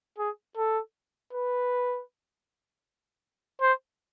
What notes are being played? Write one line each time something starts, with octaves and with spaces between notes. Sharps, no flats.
G#4
A4
B4
C5